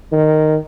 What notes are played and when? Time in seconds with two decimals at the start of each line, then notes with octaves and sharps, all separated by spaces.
0.12 D#3